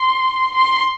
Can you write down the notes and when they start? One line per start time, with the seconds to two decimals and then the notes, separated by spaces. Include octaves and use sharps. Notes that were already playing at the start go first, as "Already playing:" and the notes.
Already playing: C6
0.55 C6